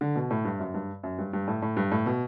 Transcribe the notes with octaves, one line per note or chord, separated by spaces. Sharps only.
D3
B2
A2
G2
F#2
G2
F#2
G2
G2
A2
A2
G2
A2
B2